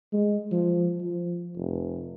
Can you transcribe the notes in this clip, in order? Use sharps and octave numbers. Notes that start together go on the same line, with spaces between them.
G#3
F3
F3
F1